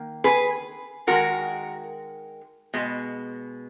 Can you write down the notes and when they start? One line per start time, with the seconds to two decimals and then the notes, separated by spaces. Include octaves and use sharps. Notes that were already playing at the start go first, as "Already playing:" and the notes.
Already playing: D#3 A#3
0.24 G#4 B4
1.07 D#3 G#3 F#4 A#4
2.74 B2 G#3